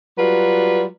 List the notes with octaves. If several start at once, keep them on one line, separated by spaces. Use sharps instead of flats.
F#3 G3 F4 B4